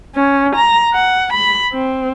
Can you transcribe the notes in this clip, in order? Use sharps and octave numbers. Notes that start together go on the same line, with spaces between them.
C#4
A#5
F#5
B5
C4